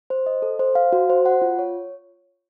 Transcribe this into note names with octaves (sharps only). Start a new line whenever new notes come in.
C5
D#5
A4
C5
F5
F#4
C5
F#5
F4
C#5